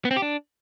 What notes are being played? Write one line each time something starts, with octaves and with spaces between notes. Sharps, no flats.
B3
C4
G4
D4